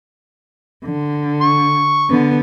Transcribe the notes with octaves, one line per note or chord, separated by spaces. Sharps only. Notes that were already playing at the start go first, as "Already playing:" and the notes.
D3
C#6
D3 B3